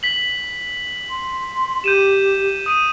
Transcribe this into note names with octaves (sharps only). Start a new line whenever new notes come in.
B6 F#7
C6
G4 G6 D#7 E7
D#6 D#7